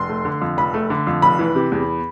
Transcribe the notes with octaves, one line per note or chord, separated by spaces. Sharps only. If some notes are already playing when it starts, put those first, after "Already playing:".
Already playing: F1 C6
A3
D3
F2
F1 B5
A3
D3
F2
F1 B5
E3
C3
E2